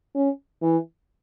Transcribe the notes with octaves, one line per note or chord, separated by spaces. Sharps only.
C#4
E3